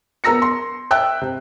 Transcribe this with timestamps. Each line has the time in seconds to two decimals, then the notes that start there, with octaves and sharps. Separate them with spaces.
0.24 B3 A#4 A#5 E6 A#6 C#7
0.42 C6
0.91 E5 G5 E6 F#6
1.21 C3